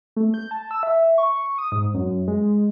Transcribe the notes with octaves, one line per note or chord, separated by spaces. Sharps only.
A3
G6
A5
E6
E5
C#6
D#6
G#2
F#2
G#3